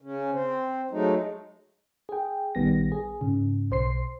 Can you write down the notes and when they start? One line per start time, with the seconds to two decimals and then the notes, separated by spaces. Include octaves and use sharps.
0.01 C#3 C#4
0.31 C4
0.91 F#3 G#3 A3 D#4
2.09 G#4 G5
2.55 A#1 D#3 G3 B3 A#6
2.92 G#4
3.21 G#2 C#3
3.71 B1 C5 C6 C7